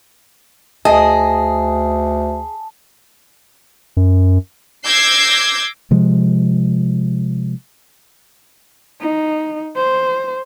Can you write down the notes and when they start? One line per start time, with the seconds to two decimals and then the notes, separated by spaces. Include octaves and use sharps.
0.85 D2 G#4 D#5 A5
3.97 F#2
4.86 D6 E6 G6 G#6 A#6 C7
5.91 C3 F3 G#3
9.00 D#4
9.76 C5